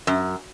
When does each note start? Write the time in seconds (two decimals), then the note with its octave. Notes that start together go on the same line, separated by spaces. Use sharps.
0.07 F#2